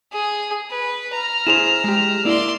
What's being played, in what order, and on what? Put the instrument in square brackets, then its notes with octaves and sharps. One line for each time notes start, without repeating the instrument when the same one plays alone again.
[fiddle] G#4
B4
A#5 F6
[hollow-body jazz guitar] E4 G#4 C5 [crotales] E7 F7
[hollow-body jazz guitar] G#3 G4
[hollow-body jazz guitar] A#3 E4 [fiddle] D5 C6